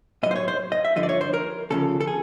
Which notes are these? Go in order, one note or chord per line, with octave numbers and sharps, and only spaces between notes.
A2 F#3 D#5
C5
C#5
C5
D#5
E5
G2 D3 F3 D#5
D5
C#5
C5
A#4
D2 C#3 F3 A4
A4
G#4